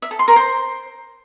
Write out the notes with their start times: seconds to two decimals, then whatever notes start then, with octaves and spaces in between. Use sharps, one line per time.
0.02 E5
0.11 A4
0.19 C6
0.28 A#4
0.36 C5